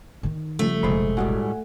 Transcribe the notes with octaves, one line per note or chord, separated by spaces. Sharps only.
D#3 D#4
C#3 F3 G3 A3
F1 B1 G#3 C5 B5
A2 G3 G#3 F#4 F#5 G#5